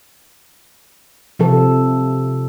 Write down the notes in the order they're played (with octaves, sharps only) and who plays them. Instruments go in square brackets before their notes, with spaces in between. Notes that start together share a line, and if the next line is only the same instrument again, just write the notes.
[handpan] C3 F3 A4